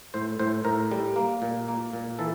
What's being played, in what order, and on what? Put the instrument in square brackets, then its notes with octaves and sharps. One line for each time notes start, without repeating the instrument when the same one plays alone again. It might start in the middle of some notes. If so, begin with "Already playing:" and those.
[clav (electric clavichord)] A2 C5
A2 C5
A2 A#4
G3
A#3
A#2
A#3
A#2
E3 A4